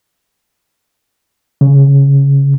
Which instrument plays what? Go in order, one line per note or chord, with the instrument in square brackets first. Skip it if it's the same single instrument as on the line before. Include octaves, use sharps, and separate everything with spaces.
[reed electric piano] C#3